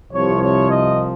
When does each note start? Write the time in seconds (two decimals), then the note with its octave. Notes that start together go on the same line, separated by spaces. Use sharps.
0.11 C2 C3 F3 C#5
0.41 C#5
0.70 D#5